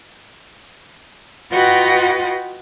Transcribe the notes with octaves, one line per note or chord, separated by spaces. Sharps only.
F4 F#4 B4 D#5 F#5 G5